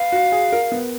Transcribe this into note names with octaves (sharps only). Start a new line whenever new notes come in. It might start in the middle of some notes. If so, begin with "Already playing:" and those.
Already playing: B4 F5
F#4
G#4
A#4
B3